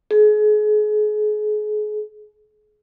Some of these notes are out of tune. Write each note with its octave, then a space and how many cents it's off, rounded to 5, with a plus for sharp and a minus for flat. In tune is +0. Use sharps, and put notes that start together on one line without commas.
G#4 +35